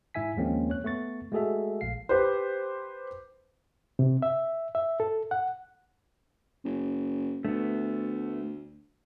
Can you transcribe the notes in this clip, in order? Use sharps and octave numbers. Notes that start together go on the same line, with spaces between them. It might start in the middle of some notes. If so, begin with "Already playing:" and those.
G#2 E4 E5 G#5 B6
D#2 F3 G#3 A#3 C4 C#4
C#5 F#6
A3 B3 C#6 A6
G#3 A3 F#4 G#4 A4 E5
A#1 F5 C7
G4 B4 C5
C3
E5
E5
A4
F#5
F#1
D2 A3 B3